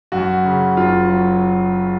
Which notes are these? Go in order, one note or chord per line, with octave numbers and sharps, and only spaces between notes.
F#2 F#4
C#3
F#1 F4
F#3